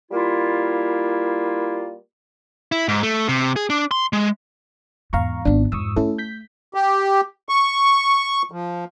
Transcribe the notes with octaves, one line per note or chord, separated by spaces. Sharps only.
G3 A#3 E4 F4
E4
G#2
A3
C3
G#4
D4
C6
G#3
E2 G#2 F5 A#5 C#6
G#1 B3 D4
F2 G#2 C#6 D#6 E6
A3 C#4 E4 A4
G6 B6
G4
C#6
F3